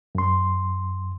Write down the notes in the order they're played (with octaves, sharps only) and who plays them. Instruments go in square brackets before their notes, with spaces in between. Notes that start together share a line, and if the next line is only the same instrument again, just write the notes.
[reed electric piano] F#2 C6